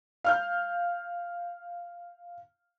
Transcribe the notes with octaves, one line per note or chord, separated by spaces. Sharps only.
F5 F6 G6